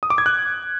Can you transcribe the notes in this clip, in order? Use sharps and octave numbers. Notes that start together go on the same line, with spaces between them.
D#6
D6
G#6
F#6